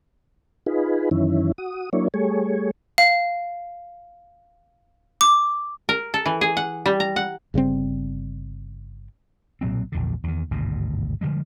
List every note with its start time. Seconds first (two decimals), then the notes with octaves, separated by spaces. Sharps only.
0.66 D#4 F4 G#4 B4
1.11 F#2 D#3 E3 C#4 E4
1.58 F#4 D#6
1.93 F#3 A#3 D4 E4 C#5
2.14 G3 A3 G#4 C#5
2.98 F5
5.21 D6
5.89 A#4
6.14 A4
6.26 E3
6.41 G#4
6.57 F#5
6.86 G3
7.00 A#5
7.16 F#5
7.54 G1 C#3 G3 C4
9.61 B1 A#2 F#3 C4
9.92 A#1 E2 D3
10.24 E2 D#3
10.51 G#1 D2 G2 B2
11.21 D3 F3 G3 G#3